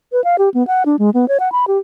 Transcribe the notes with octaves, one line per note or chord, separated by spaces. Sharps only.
B4
F5
G4
B3
F#5
D4
G#3
B3
C#5
F#5
B5
G4